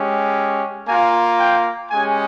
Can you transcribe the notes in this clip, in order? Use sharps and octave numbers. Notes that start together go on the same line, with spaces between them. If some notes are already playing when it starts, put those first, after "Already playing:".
Already playing: G#3 C#4 G4
A#3 F4 G#5
G5
G#3 C#4 G4 G#5